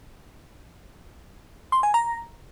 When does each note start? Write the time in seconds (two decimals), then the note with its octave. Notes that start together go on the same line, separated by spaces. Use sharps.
1.72 C6
1.83 G#5
1.94 A#5